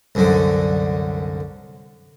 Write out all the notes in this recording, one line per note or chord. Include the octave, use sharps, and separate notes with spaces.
C2 F#2 D3